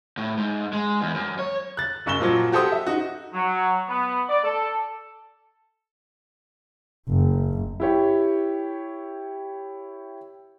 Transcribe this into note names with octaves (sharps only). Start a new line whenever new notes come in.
A2
G#2
G#3
E2
F#2
C#5
F#6 A6
F#1 F#2 C#6 E7 G7
A#2 F3 F#3
F#4 G4 A4 C5 D#6
E5
D#4 F#4
F#3
B3
D5
A4
F#1
E4 G4 C#5